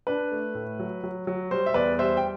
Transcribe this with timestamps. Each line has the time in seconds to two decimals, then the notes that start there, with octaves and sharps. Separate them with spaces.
0.07 D4 B4
0.31 A3
0.55 A2
0.79 F#3
1.03 F#3
1.27 F#3
1.51 G3 C5
1.66 E5
1.74 E2 B4 D5
1.99 G3 C5 E5
2.17 G5